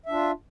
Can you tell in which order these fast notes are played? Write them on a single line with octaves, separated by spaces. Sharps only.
E5 D4 F4